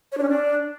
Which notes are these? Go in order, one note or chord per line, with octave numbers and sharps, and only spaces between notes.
C#5
D4
C#4
D4